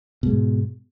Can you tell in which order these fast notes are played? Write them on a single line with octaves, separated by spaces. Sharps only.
B2 G#3 G#2